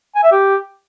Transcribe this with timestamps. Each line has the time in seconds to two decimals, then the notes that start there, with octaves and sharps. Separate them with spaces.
0.15 G#5
0.23 E5
0.32 G4